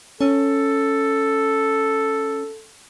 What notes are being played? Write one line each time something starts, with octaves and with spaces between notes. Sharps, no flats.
C#4 A4